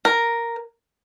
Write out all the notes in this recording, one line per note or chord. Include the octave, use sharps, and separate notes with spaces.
A#4